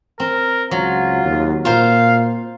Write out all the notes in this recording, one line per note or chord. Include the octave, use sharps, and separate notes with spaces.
C4 A#4
C#2 F#3 F4
D#2
A#2 F4 A#4 C5 F5